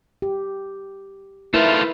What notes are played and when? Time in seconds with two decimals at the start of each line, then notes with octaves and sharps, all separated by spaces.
0.22 G4
1.54 A3 E4 F4 A#4 B4